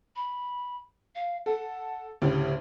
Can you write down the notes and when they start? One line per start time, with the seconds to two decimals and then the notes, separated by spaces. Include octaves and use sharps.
0.16 B5
1.15 F5
1.46 A4 F#5
2.22 D2 A2 C#3 G4